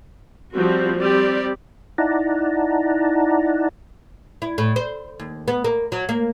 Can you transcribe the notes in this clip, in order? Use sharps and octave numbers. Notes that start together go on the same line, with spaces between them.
F3 G3 C4 F#4
G3 C4 G4 D5
D#4 E4 D5 F#5 A5 A#5
E4
A2
C5
D#2
B3
A#3
F#3
A#3